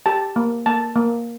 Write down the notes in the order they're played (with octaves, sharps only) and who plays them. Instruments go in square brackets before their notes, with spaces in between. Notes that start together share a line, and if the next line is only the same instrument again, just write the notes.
[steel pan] G4 A5
A#3
A#3 A5
A#3